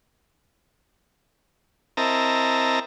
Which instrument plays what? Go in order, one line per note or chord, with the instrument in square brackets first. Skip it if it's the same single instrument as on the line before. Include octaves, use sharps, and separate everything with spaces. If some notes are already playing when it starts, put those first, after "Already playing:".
[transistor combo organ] C4 E4 A#4 D#5 A5 A#5